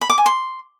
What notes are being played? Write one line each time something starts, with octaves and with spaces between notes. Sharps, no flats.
B5
D6
G#5
C6